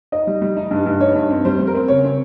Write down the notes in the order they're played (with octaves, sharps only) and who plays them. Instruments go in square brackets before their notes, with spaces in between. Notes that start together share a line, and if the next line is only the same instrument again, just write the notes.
[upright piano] D#4 D#5
G3
G3
D#4
G2
G2
D#4 C#5
G2
C4
G3 C5
G3
A#4
C4
C#3 C#5
C4